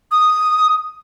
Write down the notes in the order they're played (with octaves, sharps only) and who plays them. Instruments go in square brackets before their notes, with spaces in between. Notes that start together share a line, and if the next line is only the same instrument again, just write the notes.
[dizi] D#6